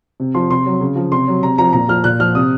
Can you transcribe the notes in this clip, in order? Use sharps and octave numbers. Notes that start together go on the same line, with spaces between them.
C3
F3 C6
C3 C6
F#3
C#3
F3
C3 C6
F#3
C3 A#5
F3 A#5
A#2 A#5
F3 F6
A#2 F#6
F3 F6
C3 D#6